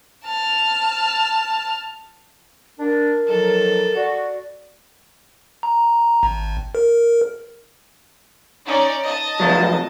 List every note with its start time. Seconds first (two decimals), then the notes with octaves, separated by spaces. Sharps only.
0.25 A5 F6
2.79 D4 A#4
3.28 D#3 F3 F#3 A4
3.96 F#4 D5
5.63 A#5
6.23 G#1
6.75 A#4
8.66 C#4 D#4 D5
9.05 D#5 A5
9.40 C3 F3 F#3